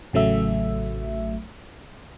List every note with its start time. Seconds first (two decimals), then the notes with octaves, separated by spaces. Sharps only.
0.13 A1 C#3 F#3 A3 E5